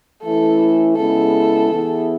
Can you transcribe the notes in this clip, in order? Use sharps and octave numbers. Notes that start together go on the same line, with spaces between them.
E3 A3 C#4 E4 A4
C#3 G#3 B3 E4 A4
E3 B3 E4 G#4